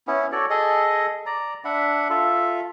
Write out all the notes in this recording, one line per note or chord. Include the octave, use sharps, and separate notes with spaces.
B3 C#4 E4
F#4 A4 C#5 D5
G#4 A4 D#5
D5 A#5
D4 E5 F#5 B5
F4 A4 E5